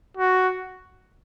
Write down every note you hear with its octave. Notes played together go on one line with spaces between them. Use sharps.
F#4